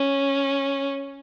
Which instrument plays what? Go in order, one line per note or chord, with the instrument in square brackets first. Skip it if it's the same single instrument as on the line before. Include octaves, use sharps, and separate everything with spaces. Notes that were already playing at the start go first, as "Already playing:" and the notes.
Already playing: [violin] C#4